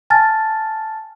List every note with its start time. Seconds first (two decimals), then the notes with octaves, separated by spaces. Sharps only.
0.10 G#5 A5 F6 A6